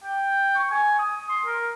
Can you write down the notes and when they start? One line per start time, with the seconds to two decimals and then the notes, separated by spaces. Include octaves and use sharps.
0.04 G5
0.56 C#6
0.71 G#5
0.99 D#6
1.29 C6
1.46 A#4